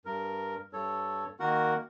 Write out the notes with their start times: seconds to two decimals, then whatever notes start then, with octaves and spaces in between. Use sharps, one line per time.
0.05 G2 A#4
0.73 G2 A4 C#5
1.40 D#3 A#3 F#4 A#4 F#5